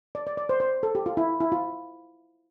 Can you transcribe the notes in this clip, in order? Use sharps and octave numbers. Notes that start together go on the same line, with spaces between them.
D5
D5
D5
C5
C5
A4
G4
F4
E4
E4
F4